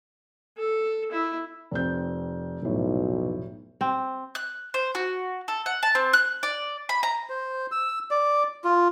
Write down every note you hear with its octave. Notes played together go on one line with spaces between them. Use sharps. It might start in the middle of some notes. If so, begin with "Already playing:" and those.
A4
E4
F1 C4 G6
F1 B1 A2
C4
F#6
C5
F#4
A4
F#5
A5
C4
F#6
D5
B5
A#5
C5
E6
D5
F4